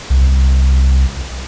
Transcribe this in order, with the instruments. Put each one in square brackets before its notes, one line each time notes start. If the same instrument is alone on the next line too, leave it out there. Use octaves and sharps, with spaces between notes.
[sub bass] C2